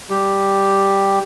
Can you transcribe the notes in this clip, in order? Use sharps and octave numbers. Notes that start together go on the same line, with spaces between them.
G3 G4